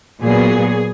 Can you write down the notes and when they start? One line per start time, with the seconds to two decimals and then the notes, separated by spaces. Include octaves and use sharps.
0.22 A#2 F#3 B3 G#4